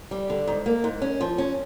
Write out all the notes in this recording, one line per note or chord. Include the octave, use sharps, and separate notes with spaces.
G3
D3
G#2
A#3
G#2
C#4
F3
C#4